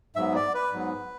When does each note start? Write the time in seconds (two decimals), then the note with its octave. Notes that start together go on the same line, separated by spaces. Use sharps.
0.16 G#2 F#3 B3 E5
0.36 D5
0.54 B4
0.73 G#2 F#3 B3